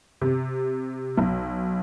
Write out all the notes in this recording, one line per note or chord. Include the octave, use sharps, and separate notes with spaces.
C3
B1